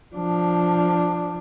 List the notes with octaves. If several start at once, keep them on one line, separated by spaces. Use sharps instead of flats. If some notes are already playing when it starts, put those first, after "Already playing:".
F3 D4